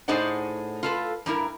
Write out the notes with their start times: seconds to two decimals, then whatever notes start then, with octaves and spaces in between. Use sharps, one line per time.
0.08 A2 D#4 G#4 C5 D5 F#5
0.83 F4 A4 B4
1.26 G2 G3 E4 A#4